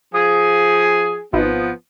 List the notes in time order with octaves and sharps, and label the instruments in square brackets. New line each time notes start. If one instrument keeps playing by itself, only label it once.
[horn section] F3 G#4
[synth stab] G#1 [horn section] F3 B3